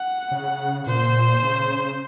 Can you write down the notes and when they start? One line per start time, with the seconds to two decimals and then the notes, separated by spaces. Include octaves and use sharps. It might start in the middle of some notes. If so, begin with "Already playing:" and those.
Already playing: F#5
0.31 C#3
0.87 A#2 C5
1.42 C#3